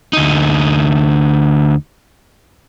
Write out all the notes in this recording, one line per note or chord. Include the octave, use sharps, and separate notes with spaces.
D2 D#4